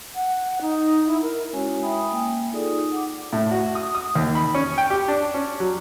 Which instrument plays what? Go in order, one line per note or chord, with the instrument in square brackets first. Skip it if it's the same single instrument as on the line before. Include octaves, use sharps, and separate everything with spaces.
[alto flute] F#5
D#4
E4
A#4
[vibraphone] G#3 C#4 E4 F#4 C#5 G#5
E5 G5 G#5 B5 D#6
A#3 G5
D#4 F4 G#4 A4 D5 D#6
F#5 D6
[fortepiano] A2
F#4
D#6
D#6
D#2
B5
C#4
G5
G4
D4
C#4
F#3